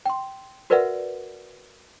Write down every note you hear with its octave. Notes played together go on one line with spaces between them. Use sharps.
G5 C6
F#4 A#4 B4 D5 E5 F#5